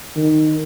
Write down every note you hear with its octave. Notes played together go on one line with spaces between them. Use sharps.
D#3